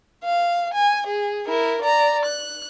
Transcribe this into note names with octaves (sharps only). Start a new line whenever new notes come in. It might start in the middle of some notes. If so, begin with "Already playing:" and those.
F5
G#5
G#4
E4 A#4
D5 A#5
F#6